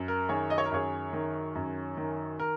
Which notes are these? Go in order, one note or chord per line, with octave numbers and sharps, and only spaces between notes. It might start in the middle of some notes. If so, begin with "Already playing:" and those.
Already playing: F#2
A#4
D#3 G#4 C#5
D#5
C#5
A#4
F#2 G#4 C#5
D#3
F#2
D#3
A#4